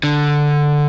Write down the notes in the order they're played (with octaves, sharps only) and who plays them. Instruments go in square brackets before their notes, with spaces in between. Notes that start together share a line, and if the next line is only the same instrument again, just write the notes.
[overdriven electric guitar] D3